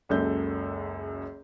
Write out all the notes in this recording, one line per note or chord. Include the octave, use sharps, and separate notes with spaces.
F#1 C#2 F#2 A4 G6